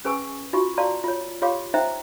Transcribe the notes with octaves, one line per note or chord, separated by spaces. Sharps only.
C#4 G#4 B4 G#5 C#6 E6
D#4 F4 F#4 C#6
D5 F5 A5 A#5 C6
F4 C#5
F4 G4 C#5 F5 C6 D6
D#4 C5 E5 G5 A#5